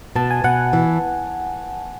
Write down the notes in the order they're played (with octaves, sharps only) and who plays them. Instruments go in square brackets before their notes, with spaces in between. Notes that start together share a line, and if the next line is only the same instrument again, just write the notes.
[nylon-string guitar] B2 [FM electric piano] A5
[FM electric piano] G#5
[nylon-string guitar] B2 [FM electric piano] F#5
[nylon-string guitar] E3